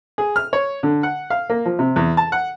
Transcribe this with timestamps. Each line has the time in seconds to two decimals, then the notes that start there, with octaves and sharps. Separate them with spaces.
0.18 G#4
0.36 F6
0.53 C#5
0.83 D3
1.03 F#5
1.30 F5
1.50 A#3
1.65 F3
1.79 C3
1.96 E2
2.17 A5
2.32 F#5